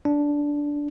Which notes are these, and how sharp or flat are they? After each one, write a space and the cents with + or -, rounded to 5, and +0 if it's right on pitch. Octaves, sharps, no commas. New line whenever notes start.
D4 -10